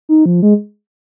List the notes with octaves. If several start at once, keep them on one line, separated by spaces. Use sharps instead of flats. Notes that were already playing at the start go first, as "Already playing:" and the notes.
D#4
F3
G#3